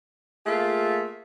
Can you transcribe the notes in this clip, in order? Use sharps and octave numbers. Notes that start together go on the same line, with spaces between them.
A3 A#3 F4 G#4 E5